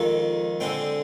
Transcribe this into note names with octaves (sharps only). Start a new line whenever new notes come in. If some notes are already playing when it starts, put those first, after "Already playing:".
Already playing: F2 D#3 G#3
D3 G#3 C4 G5